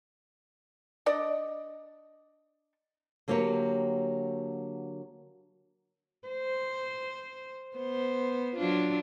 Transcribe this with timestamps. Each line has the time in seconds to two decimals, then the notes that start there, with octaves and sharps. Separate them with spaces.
1.06 D4 D5 D#5
3.28 D3 F#3 A#3 G4 B4 C#5
6.28 C5
7.77 B3 C5
8.57 F#3 D4 F4